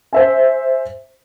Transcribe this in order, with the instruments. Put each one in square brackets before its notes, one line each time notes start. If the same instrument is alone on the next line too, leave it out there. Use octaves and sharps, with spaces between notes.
[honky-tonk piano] C5 E5 G#5